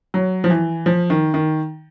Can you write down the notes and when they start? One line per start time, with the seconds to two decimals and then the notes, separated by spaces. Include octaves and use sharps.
0.14 F#3
0.44 F3
0.50 E3
0.86 F3
1.10 D#3
1.34 D#3